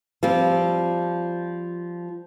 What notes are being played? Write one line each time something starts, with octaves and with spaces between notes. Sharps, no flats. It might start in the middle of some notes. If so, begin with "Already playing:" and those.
F3 G3 C4